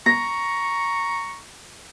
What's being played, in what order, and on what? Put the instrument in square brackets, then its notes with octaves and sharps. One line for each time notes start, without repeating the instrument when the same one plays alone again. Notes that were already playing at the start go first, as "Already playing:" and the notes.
[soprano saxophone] A#5 [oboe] C#6 [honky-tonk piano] A#6